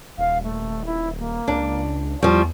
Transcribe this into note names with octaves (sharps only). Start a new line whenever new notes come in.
D#1 F5
A3
E4
A#3
C#2 D4
E2 F3 G3 C#6